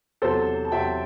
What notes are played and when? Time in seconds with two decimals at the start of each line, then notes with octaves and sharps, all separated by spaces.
0.22 E2 C3 F#3 A4 C5
0.65 A5
0.72 E2 C3 F#3 E5 G5